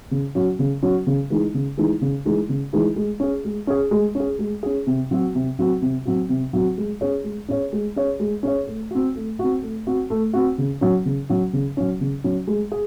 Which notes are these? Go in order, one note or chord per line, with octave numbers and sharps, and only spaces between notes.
C#3
F#3 C#4 F#4
C#3
F#3 C#4 F#4
C#3
E3 G#3 D#4
C#3
E3 G#3 D#4
C#3
E3 G#3 D#4
C#3
E3 G#3 D#4
G#3
C#4 G#4
G#3
C#4 G#4
G#3
C#4
G#4
G#3
C#4 G#4
C3
F#3 C4 F#4
C3
F#3 C4 F#4
C3
F#3 C4 F#4
C3
F#3 C4 F#4
G#3
C#4 G#4 C#5
G#3
C#4 G#4 C#5
G#3
C#4 G#4 C#5
G#3
C#4 G#4 C#5
A3
C4 F#4
A3
C4 F#4
A3
C4 F#4
A3
C4 F#4
C#3
F#3 C#4
C#3
F#3 C#4
C#3
F#3 C#4
C#3
F#3 C#4
G#3
G#4